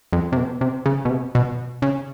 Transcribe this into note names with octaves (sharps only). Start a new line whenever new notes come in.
F2
C3
B2
C3
C#3
B2
C3
B2
C#3